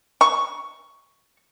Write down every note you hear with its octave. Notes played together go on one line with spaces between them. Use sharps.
C#6